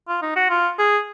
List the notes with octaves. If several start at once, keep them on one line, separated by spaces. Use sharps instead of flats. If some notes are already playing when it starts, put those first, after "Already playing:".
F4
D#4
F#4
F4
G#4